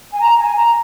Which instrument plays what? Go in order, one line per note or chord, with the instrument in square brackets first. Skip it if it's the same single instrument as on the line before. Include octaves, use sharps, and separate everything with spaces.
[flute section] G#5
A#5
G#5
A#5